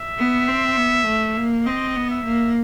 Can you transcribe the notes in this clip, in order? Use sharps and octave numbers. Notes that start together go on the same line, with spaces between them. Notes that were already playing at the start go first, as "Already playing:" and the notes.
Already playing: E5
B3
C4
B3
A3
A#3
C4 D#5
B3
E5
A#3